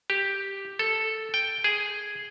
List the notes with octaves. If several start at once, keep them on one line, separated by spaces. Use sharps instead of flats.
G4
A4
G5
G#4